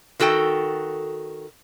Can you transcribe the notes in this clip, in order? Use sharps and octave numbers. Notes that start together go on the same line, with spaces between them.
D#3 F#4 A4 G5